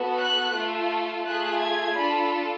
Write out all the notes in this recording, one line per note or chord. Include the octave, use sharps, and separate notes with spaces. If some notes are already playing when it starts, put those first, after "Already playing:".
Already playing: B3 F#4 A4
F#6
A3 F4 A4
A3 F4 G#4 F#6
G#6
D4 F4 A4 B5